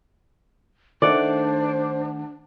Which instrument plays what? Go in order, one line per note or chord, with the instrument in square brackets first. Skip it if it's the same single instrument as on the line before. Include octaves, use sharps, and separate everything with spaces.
[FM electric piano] D#3 A3 F#5 [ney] D4 [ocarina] C5 [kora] D5